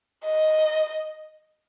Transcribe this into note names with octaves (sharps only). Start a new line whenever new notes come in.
D#5